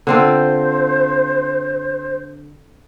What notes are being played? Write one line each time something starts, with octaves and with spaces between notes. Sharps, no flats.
D3 C4 F4 C5